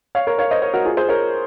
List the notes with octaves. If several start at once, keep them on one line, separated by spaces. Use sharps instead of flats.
C#5 F5
A#4 C#5
C#5 F5
C5 D#5
A#4 C#5
F#4 A#4
F4 G#4
G#4 C5
A#4 C#5